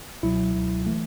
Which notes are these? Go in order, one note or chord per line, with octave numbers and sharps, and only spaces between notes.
C#2 B2 F#3 E4
C#2 B2 F#3
E3 A3